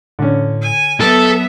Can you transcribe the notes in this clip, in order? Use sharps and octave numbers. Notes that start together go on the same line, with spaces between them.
A2 D3 C#4
G#5
F#3 B3 A4 E5